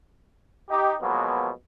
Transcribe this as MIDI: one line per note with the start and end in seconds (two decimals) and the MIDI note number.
0.69 0.95 63
0.69 0.95 67
1.01 1.49 47
1.01 1.49 53
1.01 1.49 54
1.01 1.49 56
1.01 1.49 58
1.01 1.49 59